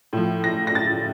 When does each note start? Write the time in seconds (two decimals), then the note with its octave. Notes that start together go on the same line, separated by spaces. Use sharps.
0.13 A2 F3
0.44 A#6
0.67 A#6
0.75 A6